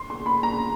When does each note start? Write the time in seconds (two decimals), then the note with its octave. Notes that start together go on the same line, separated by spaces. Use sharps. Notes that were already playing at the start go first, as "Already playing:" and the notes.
Already playing: C6
0.10 C6
0.26 B5
0.43 A#5